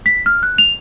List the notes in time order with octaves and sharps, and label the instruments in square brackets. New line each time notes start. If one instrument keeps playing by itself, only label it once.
[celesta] B6
F6
F#6
F7